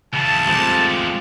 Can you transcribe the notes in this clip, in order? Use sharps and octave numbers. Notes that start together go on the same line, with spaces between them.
C#3 E3 A5
G#3 A3 C4 F4 G4